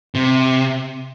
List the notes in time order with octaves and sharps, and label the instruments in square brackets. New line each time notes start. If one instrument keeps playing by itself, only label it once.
[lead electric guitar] C3